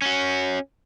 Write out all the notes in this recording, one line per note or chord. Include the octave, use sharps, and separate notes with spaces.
C#4 F#4